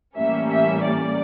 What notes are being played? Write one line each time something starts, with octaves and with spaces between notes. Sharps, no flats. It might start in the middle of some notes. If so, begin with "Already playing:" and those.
A2 E3 G3 A#3 C#4 E5
E5
D5